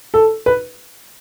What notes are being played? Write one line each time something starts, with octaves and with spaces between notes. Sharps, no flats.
A4
B4